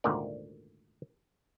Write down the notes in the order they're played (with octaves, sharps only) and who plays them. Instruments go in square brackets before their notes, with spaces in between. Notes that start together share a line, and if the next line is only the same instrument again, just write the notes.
[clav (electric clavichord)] G#1 D2 A#2 D3 D#3 D5